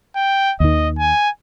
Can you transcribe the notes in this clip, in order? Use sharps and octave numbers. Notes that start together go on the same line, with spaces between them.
G5
D#2 D#3 D#5
G#5